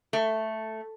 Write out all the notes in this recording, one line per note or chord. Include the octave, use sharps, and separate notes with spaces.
A3